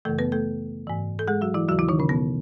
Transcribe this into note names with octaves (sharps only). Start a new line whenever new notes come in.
F#2 C#3 E3 A3 A4
B3 B4
A3 A4
G#2 E3
A4
G#3 G#4
F#3 F#4
E3 E4
D#2 C#3 E3 F#3 F#4
E3 E4
D#3 D#4
C#3 C#4
B2 B3